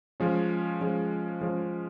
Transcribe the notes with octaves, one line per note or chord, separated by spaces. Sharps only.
F3 G#3 C#4
F3 G#3 C#4
F3 G#3 C#4